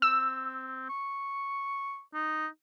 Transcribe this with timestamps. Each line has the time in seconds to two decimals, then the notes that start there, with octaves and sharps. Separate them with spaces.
0.02 C4 E6
0.89 C#6
2.14 D#4